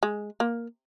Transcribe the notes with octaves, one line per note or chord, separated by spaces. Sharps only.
G#3
A#3